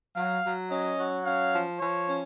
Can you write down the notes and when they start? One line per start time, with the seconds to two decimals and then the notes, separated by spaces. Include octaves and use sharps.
0.16 F#3 F5
0.43 F#3
0.71 C#4 D#5
0.98 F#3
1.25 C#4 F5
1.53 F3
1.80 F3 C#5
2.08 C#4